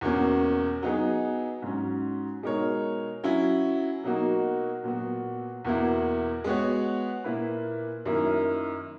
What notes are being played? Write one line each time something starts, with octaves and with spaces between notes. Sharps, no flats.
E2 B2 A#3 C#4
F#3 B3 D#4 G#4
G#2 F#3 C#4
B2 G#3 D#4 A#4 C#5
F#3 C#4 E4
B2 F#3 A#3 D#4 F#4
A#2 F#3 B3 F#4
E2 B2 A#3 E4
G#3 B3 F#4 C#5
A#2 A#3 E4 B4
F#2 D#3 A#3 E4 A#4